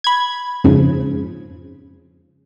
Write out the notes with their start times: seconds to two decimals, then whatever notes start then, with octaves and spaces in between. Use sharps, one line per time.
0.04 B5 G#6
0.64 F2 G#2 C#3 F3